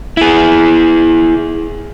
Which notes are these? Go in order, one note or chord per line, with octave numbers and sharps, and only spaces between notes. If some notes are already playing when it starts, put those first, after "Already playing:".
E4 G#4